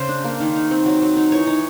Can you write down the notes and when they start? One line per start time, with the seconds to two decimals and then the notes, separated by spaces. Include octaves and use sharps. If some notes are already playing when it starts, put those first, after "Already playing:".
Already playing: C#3 G#4 C5
0.09 D4
0.24 A#3
0.40 D#3
0.55 D#4
0.71 C4
0.86 F#3
1.02 F#3
1.16 D#4
1.32 E3 C#5
1.47 D#4